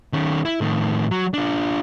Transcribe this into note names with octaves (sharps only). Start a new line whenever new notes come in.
D#3 C#4
E4
A2 D#3
F#3
D4 F4